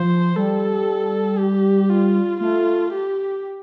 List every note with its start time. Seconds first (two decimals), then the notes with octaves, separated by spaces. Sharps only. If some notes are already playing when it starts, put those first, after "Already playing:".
Already playing: F3 C5
0.36 G3 A4
1.39 G4
1.90 F4
2.41 A3 F4
2.93 G4